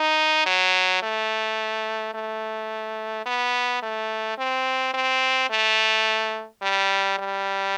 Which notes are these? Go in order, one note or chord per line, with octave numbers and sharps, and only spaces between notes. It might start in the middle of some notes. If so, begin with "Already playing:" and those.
Already playing: D#4
F#3
A3
A3
B3
A3
C4
C4
A3
G3
G3